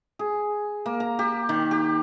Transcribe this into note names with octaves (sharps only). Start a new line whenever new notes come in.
G#4
A#3
A#5
G4
D#3
G4